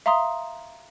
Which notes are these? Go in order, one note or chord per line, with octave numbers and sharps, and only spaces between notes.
E5 F5 A#5 C6 D#6